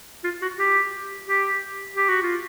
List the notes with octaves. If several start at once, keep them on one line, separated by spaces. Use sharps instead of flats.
F4
F#4
G4
G4
G4
F#4
F4